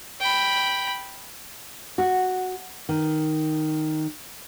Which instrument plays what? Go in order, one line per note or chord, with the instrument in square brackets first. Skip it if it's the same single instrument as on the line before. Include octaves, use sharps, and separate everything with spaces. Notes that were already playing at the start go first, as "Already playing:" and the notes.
[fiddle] G5 B5
[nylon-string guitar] F#4
D#3